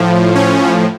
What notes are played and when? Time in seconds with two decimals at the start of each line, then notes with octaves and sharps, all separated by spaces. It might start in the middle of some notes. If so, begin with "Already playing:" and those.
Already playing: A2 F3
0.35 C#4